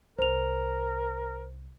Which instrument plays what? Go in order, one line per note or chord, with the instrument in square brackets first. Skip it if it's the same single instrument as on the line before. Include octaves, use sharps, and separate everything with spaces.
[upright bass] C2 [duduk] A#4 [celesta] C5 F7